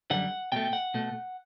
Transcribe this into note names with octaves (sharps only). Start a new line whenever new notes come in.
F#2 D3 G3 F#5
B2 A3 G5
F#5
B2 A3